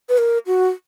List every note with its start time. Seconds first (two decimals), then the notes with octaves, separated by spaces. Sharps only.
0.09 B4
0.18 A#4
0.47 F#4